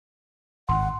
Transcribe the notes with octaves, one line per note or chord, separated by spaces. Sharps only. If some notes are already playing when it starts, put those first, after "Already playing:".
G#1 F#5 C6